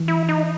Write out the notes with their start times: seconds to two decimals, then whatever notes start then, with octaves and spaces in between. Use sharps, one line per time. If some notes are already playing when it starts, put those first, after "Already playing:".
Already playing: E3
0.08 E4
0.29 D#4